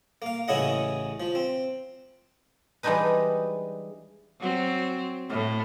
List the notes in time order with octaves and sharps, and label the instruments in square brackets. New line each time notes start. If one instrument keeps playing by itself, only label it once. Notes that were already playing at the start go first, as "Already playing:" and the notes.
[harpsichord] A#3 F5
A1 C#3 C#4 E4 D#5 F#5
F3
C4
[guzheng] E3 G3 G#3 D4 D#4 B4
[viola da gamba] F#3 C4
A2